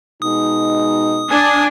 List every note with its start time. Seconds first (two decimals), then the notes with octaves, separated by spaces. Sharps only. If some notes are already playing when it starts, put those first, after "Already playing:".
0.22 B2 G#3 D#4 D#6
1.31 D4 G#5